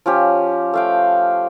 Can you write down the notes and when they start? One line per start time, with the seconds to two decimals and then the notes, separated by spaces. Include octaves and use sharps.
0.06 F3 C#4 G4
0.74 A3 F5 G5